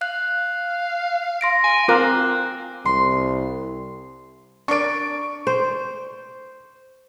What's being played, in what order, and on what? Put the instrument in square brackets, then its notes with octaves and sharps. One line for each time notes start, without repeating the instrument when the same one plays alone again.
[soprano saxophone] F5 [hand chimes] F#6
[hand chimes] C6 A#6 D7
[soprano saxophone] G#5
[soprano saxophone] C4 [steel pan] F4 A#4 [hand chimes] D6 F#6
[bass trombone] C2 [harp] C6
[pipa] D4 A#4 D5 [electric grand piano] C#6 D7
[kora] C5